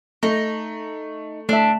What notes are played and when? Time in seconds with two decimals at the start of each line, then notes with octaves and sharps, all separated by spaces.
0.23 A3 D#4
1.49 A3 D4 E5